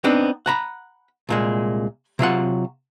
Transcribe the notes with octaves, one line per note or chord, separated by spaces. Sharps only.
B3 C4 D4 D#4
F#5 A#5 B5
C2 A#2 G#3
C3 F#3 F4 F#5